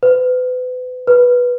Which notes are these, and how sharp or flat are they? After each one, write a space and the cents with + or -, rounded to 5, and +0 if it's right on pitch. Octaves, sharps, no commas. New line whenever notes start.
B4 +35
B4 -10